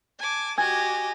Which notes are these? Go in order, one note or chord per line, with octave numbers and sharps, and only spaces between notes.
G#5 A5 D6
F#4 G4 D#5 G#5